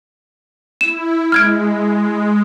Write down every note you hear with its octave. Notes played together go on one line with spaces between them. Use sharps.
E4 E7
G#3 F6 G#6 D7